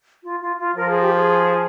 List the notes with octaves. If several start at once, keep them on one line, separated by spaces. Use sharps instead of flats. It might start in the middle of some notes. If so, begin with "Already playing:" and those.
F4
F4
F4
F3 A#4
G#4
G4
G#4